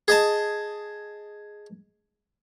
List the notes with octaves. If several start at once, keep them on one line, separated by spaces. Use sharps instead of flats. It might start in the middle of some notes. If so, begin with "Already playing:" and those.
G#4 D#5 A5